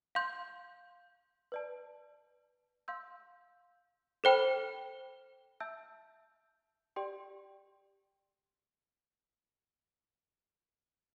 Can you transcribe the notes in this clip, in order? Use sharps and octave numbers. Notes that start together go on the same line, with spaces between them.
F5 C6 G6
B4 D5 A5
F5 C6 E6 G6
A4 C5 G5 B5 F6
E5 A5 E6 G6
G4 D5 G5 C6